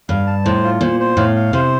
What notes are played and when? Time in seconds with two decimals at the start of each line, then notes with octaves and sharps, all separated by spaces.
0.09 G2 F5
0.27 A5
0.45 A2 C5
0.64 F4
0.81 A#2 C5
1.00 C5
1.17 A2 F5
1.35 F5
1.53 C3 C5